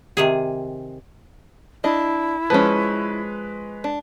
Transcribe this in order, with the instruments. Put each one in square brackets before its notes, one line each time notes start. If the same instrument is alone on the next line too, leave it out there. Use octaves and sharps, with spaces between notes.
[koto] C3 D#3 G#4
[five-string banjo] D4 D#5 [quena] E4
[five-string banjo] F3 C#4 [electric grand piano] G#3 B4
[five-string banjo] D4